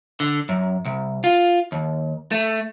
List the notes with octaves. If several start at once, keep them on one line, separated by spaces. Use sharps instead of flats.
D3
F#2
C2
F4
D#2
A3